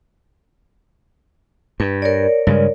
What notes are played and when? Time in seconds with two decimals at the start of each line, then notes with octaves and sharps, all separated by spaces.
1.80 G2 B4
2.02 A#4 C#5 D5
2.47 G2 C#3 G#3